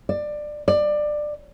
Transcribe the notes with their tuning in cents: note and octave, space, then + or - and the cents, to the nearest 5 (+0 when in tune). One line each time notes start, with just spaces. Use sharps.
D5 +20
D5 +20